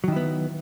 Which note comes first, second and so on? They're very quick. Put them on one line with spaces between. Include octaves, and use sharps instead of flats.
F#3 D#3 E4 B3